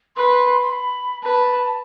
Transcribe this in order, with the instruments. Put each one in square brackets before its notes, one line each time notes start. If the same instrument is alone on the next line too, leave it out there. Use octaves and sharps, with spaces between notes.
[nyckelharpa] B4 [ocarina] C6
[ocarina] C6
B5
[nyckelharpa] B4 [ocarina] A5